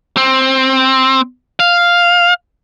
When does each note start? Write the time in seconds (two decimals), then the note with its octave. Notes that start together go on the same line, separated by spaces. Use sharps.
0.17 C4
1.60 F5